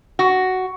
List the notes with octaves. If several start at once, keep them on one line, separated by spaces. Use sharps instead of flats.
F#4